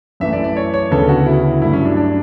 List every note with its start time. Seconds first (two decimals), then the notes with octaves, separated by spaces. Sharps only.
0.20 F#2 E3 A3 E5
0.33 D5
0.44 D5
0.57 C#5
0.74 C#5
0.91 D2 C#3 E3 B3 A4
1.09 F#4
1.26 E4
1.62 G2 F#3 A3 E4
1.73 C#4
1.85 D4
1.97 D4